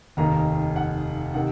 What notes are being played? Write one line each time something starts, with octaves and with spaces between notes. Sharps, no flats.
F1 D#2 D#3 A#5
F#5
C3 D#3 F#5